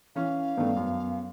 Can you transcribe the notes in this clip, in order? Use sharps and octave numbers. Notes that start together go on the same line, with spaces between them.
E3 C#4 F5
G2 D#3 A3 B3
F#2